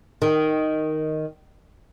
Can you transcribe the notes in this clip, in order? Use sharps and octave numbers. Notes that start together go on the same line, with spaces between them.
D#3